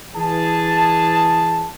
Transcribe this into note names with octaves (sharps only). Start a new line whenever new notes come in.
E3 G#4 A5